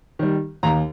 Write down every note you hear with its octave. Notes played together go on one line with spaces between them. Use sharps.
D#3 G3
D#2 A#5